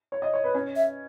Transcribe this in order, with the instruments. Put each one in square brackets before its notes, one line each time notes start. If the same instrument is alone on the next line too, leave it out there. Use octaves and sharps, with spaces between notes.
[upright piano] C#5
D#5
C#5
B4
C#4
[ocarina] E5